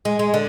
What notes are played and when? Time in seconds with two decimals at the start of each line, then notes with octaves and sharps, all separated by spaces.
0.05 G#3
0.19 G#3
0.34 D3